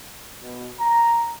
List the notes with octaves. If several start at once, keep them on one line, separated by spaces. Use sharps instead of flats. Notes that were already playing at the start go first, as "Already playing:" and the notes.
B2
A#5